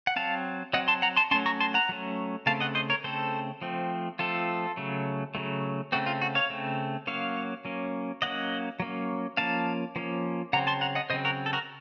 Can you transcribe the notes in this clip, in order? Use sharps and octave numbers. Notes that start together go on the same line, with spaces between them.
F#5
F#3 C4 F5 A5
F#3 C4 D#5 F#5
A5 C6
F#5 A#5
A5 C6
F#3 A3 C#4 A5 C6
A#5 C#6
A5 C6
F#5 A#5
F#3 A3 C#4
C#3 A3 C4 F5 A5
D#5 F#5
C5 D#5
A#4 C#5
C#3 A3 C4 A4 C5
F3 A3 C4
F3 A3 C4 F4 A4
C#3 F#3 A3
C#3 F#3 A3
C#3 A3 C4 F#4
F4
F#4
C#5 F5
C#3 A3 C4
F#3 A#3 C#4 C#5 F5
F#3 A#3 C#4
F#3 A#3 C#4 D#5 F#5
F#3 A#3 C#4
F3 A#3 C#4 F5 A5
F3 A#3 C#4
C#3 F#3 C4 F#5 A#5
A5 C6
F#5 A#5
D#5 F#5
C#3 F#3 C4 C5 D#5
F#4 A#4
A4
F#4 A#4